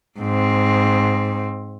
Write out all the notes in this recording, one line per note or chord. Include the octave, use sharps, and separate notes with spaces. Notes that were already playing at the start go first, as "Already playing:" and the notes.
G#2 C4